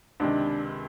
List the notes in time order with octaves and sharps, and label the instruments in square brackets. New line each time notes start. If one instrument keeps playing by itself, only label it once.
[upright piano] C#2 C3 D#3 [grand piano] D4